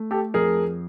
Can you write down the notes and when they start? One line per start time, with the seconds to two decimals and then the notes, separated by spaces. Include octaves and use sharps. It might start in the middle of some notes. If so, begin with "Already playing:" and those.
Already playing: A3
0.11 G4 A4
0.34 F2 G#4 A#4